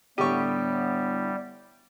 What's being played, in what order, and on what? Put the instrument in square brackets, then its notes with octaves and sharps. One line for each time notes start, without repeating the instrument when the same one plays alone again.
[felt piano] A2 D3 D#7 [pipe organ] G3 [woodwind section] B3 [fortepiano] G4 C#6